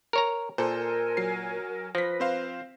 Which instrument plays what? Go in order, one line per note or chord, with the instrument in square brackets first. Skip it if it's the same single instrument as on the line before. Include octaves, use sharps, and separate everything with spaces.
[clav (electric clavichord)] A#4 C#5 A#5
[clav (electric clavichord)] A#2 [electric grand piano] A4 C5 [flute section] A#4 G#5
[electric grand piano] F#3 C7
[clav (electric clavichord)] F3 [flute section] B4 [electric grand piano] A#6 B6
[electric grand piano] C4 C5 F5